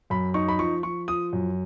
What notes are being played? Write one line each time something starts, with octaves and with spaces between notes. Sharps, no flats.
F#2 B5
D#4 C#6
B5
F3 C#6
F3 C#6
F3 D#6
F#2